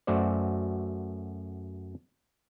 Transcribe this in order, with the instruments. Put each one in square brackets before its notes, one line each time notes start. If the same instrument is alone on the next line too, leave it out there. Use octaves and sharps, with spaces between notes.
[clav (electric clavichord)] F#2 A3 F#4 C5 D5